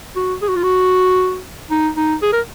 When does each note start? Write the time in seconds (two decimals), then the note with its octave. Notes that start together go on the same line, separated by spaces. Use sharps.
0.16 F#4
0.42 G#4
0.49 F#4
0.56 F4
0.64 F#4
1.71 D#4
1.97 D#4
2.22 G#4
2.33 A#4